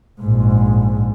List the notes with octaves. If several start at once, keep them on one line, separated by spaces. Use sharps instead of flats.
A#1 G#2